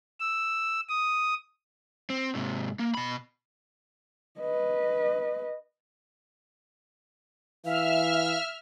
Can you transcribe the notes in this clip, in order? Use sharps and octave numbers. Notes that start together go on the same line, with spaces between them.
E6
D#6
C4
G#2 C3
A#3
B2 B5
B4 D#5
E3 E5 F5 F6